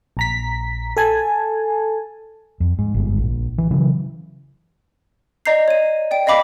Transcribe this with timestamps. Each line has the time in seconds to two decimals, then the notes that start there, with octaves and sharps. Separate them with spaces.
0.17 A#1 A#5 B6
0.97 A4 G#5 A5
2.60 F2
2.79 G#2
2.94 G1 G#2
3.18 A#1
3.58 E3
3.71 C#3 E3 F#3
5.46 D5 D#5 A#5 G6 C7
5.68 C#5 D#7
6.11 D5 G5 D7
6.26 D5 D#5 F5 B5 D6 B6